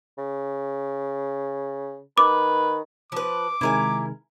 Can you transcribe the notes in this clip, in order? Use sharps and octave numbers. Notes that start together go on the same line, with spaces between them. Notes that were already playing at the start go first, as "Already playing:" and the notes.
C#3
D#3 B4 D6
F3 B4 D6
C3 D#3 G#3 E4 A#4 G#5